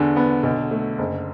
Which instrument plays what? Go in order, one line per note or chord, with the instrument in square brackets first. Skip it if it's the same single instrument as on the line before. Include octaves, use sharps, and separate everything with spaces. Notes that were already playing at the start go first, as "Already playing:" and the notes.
Already playing: [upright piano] E2 D4 [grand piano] D3
[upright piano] B3
B1
A3
F#1